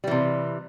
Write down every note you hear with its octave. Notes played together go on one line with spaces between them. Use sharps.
C3 E3 G3